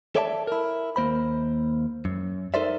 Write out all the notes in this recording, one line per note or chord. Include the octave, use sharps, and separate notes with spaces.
A4 C#5 D5 E5 G#5 A5
E4 A#4
D#2 A#3 C5 B5
F#2
D#4 A4 A#4 C5 D5 E5